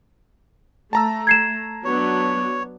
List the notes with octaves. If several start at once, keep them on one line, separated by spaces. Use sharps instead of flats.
A3 A5 A#5 E6
G#6 C7 E7
F#3 B3 D4 C#5